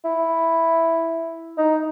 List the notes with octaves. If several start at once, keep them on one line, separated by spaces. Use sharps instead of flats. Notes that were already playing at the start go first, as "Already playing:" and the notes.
E4
D#4